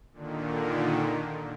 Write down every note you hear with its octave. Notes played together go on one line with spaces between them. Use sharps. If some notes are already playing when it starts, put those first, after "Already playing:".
A#2 D3 D#3